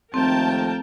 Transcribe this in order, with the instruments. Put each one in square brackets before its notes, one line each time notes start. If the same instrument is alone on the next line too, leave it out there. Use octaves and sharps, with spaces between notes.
[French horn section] D#2 F3 A3 [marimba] C4 [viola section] A#4 G5 A5